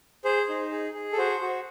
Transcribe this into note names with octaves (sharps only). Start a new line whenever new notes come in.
G#4 C5
D#4
G#4
G#4
A4
F#4 C5
F#4